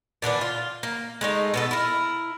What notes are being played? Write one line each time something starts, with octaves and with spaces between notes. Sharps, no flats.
A#2 D3 E3 D4
F4
A#3
G#3 A3 D#4
B2 B3 A4
E4 A#4